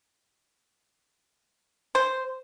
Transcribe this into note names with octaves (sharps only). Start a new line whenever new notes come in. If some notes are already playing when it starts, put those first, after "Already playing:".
C5